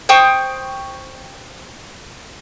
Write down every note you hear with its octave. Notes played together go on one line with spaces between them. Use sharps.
C5 G5 C#6 D#6